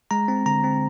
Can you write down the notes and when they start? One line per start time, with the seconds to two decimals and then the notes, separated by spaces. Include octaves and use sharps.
0.11 G#3 A#5
0.28 C4
0.46 D3 A#5
0.64 C4